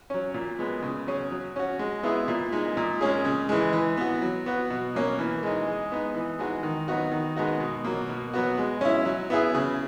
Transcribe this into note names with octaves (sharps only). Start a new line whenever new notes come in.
F#3 C#4
A#2
G#3 B3
C#3
F#3 C#4 G#4
F#3
C#4 F#4
G#3
B3 E4 G#4
A#2
G#3 D#4
A#2
G#3 C#4 G#4
C#3
E3 G#3
E3
B3 F#4
F#3
B3 F#4
B2
F#3 A#3 C#4
E3
G#3 D#4
G#3
B3 D#4
E3
G#3 D#4 F#4
D#3
F#3 B3 D#4 F#4
D#3
G#3 B3 D#4 F#4
B2
F#3 A#3
B2
F#3 B3 F#4
G#3
C#4 E4
F#3
B3 E4 G#4
C#3